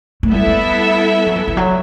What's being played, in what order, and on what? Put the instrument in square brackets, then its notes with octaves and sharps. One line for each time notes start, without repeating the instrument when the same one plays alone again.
[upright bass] A3
[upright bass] G3 [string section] B3 E4 A4 E5
[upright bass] G3
F#3
E3
E3
F#3